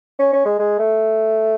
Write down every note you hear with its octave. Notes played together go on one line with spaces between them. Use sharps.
C#4
C#4
G#3
G#3
A3